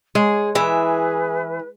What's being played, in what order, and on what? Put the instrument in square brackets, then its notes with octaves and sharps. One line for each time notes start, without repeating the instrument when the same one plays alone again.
[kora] G#3 [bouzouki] G#4 [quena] C#5
[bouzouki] E3 E5 [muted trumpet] G#4 [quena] B4